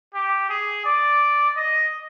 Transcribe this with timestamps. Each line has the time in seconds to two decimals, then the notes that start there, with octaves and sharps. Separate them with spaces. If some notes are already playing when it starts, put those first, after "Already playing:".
0.14 G4
0.49 G#4
0.85 D5
1.56 D#5